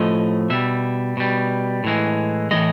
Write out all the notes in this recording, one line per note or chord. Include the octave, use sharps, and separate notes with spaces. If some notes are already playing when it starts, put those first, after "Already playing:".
Already playing: A2 F3 A3 D#5
B2 G3 E5
B2 G3
A2 E3 G#3
A2 E3 G#3 D#5